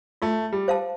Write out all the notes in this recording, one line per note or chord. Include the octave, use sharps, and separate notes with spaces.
A3 F4
G3
C5 F5 A5